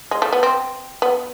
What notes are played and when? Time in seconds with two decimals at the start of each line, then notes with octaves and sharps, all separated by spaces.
0.11 G#3
0.22 A3
0.33 B3
0.43 C4
1.02 B3